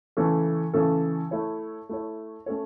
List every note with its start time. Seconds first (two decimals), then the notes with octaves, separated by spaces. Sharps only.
0.17 C#3 E3 A3 C#4 A4
0.74 C#3 E3 A3 C#4 A4
1.31 A3 E4 C#5
1.89 A3 E4 C#5
2.46 A3 C#4 A4 C#5